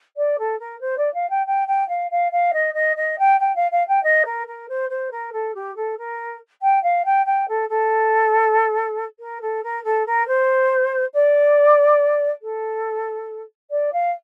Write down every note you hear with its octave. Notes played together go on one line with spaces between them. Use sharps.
D5
A4
A#4
C5
D5
F5
G5
G5
G5
F5
F5
F5
D#5
D#5
D#5
G5
G5
F5
F5
G5
D#5
A#4
A#4
C5
C5
A#4
A4
G4
A4
A#4
G5
F5
G5
G5
A4
A4
A#4
A4
A#4
A4
A#4
C5
D5
A4
D5
F5